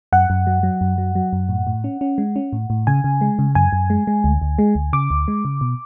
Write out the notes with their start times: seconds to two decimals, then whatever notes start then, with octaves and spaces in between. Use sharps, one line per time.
0.12 F#2 F#5
0.30 F#2
0.47 F#3
0.63 F#3
0.81 F#2
0.98 F#3
1.15 F#3
1.33 F#2
1.49 A2
1.67 A2
1.84 C#4
2.01 C#4
2.18 G#3
2.36 C#4
2.53 A2
2.70 A2
2.87 C#3 G#5
3.04 C#3
3.21 G#3
3.39 C#3
3.55 F#2 G#5
3.73 F#2
3.90 G#3
4.07 G#3
4.24 D2
4.42 D2
4.58 G#3
4.75 D2
4.93 C#3 D6
5.10 D2
5.28 G#3
5.45 C#3
5.61 B2